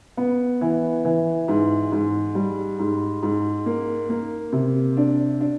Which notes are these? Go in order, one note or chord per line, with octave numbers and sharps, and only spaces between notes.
B3
E3
E3
G#2
G#2
G3
G#2
G#2
A#3
A#3
C3
D4
D4